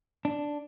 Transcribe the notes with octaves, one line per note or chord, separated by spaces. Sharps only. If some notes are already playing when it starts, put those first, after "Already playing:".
D4